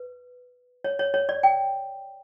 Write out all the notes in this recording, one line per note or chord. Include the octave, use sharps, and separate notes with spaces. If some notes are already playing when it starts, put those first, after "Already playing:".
Already playing: B4
C#5
C#5
C#5
D5
G5